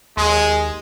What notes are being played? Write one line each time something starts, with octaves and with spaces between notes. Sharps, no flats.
D#2 G#3 C6 D#6